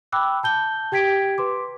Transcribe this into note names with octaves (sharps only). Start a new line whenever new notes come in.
G5 B5 D6 E6 F#6
A5 G6 G7
G4 G5 G#6 B6 D7
B4 C6 D6